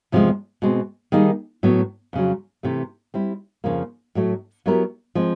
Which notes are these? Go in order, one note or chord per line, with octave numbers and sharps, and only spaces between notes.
E2 C3 F3 G#3
B2 G#3 C4
D#3 G3 A#3 D#4 G#4
A2 F#3 B3
F2 C#3 F#3
C3 E3 A3
G3 C4 E4
F2 C#3 F3 A#3
A2 F#3 A3
F#3 B3 E4 G4 A#4
F3 G#3 C4